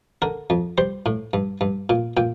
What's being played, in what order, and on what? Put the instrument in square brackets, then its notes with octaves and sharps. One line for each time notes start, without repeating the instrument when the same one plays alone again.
[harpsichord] D3 A#4
F2
G3 C5
A2
G2
G2
A#2
A#2 G5